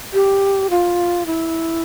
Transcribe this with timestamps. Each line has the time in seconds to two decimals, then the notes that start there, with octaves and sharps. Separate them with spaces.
0.13 G4
0.70 F4
1.26 E4